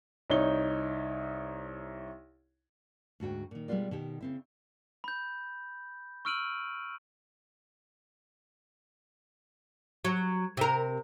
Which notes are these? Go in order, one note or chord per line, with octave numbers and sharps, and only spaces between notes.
C2 D#4 C#5 G7
D2 G#2 F#4 G5
A#2 D#3
B2 G3 G#3 B3 F4 D5
B2 D#3 G4
C#3 C4 E4
B5 G6
C#6 E6 F6 D7 D#7 F#7
F#3
C3 A#4